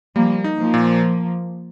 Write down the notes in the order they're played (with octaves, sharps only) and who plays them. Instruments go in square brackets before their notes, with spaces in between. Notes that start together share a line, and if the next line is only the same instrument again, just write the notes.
[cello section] F3 A#3 [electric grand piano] G3
[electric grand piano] D#4
[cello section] F3 A#3
[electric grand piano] A#2